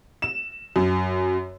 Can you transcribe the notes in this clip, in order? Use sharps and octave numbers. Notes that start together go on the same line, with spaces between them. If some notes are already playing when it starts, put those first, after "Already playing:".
E7
F#2